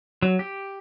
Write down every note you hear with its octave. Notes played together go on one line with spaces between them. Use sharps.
F#3
G4